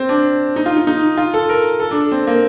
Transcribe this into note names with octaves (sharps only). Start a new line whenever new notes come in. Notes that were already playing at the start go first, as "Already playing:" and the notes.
Already playing: C4
D4
D#4
F4
D#4
D#4
F4
A4
A#4
A4
D4
C4
A#3